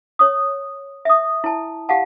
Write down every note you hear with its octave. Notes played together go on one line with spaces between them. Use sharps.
C#5 D#6
E5 D#6
E4 A5
G4 F5 F#5 A5